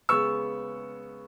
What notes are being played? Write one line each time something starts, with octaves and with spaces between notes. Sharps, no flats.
C#3 G#3 B3 C#6 E6